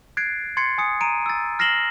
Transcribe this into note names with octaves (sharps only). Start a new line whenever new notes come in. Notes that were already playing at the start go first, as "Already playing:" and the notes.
F#6 G#6 A6 C7 D7
C6 G#6 A6 C7 C#7
G#5 D#6 C#7
A#5 D7 D#7
E6 A6
F6 A#6 C7 E7 F#7 G7